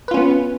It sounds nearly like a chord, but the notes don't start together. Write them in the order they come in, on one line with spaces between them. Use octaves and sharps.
B4 F4 C#4 B3